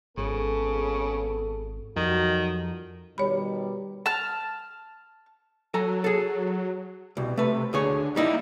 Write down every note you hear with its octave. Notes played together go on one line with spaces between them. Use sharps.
G#1 C#3 B3 G#4 A4
F2 D#3 F#3 G3 F#4
B2 D#3 G3 C#5 B5
A5 F6
F#3 A4 G#5 A#5
G#4 A4
C2 B2
C3 A3 B4
D2 D3 G#4 C#5
G3 A#3 D#4 E4